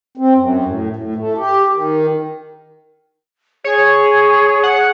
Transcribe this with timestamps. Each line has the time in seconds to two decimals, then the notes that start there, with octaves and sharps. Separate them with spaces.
0.17 C4
0.38 F#2
0.65 A2
0.96 A2
1.16 A3
1.38 G4
1.73 D#3
3.64 G#4 C#5
4.63 F#5